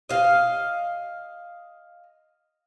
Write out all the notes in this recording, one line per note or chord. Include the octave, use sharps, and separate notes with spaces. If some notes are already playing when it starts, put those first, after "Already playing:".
D#5 F5